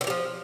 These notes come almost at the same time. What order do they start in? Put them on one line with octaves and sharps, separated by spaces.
D3 E3 G3 F3